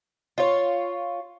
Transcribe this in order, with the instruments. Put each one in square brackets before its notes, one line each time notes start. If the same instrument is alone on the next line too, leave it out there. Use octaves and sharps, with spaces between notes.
[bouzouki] F4 C#5